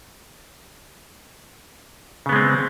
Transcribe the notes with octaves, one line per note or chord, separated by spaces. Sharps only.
C#3 G#3 B3 C4